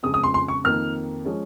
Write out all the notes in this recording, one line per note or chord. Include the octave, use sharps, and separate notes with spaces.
F2 C#3 G#3 D#6
D#6
C6
C6
C#6
F2 D#3 A#3 F6
F3 G#3 C#4